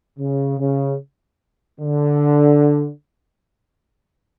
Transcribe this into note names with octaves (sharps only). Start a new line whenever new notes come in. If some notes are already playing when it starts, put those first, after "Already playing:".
C#3
C#3
D3